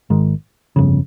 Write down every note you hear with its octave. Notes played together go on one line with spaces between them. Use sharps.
G#1 G#2 D#3
G1 F2 C#3